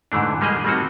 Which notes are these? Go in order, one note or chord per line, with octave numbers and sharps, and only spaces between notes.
G#2 D3 E3 A3 D4
G3 G#3 A#3 G4 G#4 D#5
G3 A3 A#3 C4 D#4 F#4